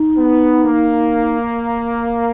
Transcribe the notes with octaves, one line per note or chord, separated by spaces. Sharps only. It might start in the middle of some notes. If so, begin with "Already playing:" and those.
Already playing: D#4
B3
A#3